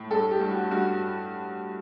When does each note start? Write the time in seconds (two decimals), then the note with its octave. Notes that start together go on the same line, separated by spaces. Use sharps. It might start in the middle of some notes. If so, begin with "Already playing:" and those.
Already playing: A2
0.11 G2 A4
0.31 G4
0.41 G2
0.51 F#4
0.71 G2 F#4